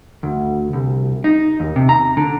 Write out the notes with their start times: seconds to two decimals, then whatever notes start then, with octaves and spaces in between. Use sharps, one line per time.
0.23 D2
0.73 C2
1.24 D#4
1.60 D#2
1.76 C3
1.89 A#5
2.17 D3